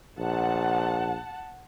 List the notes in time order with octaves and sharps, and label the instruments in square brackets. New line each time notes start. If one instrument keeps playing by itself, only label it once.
[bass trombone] A#1 [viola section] F#5 A5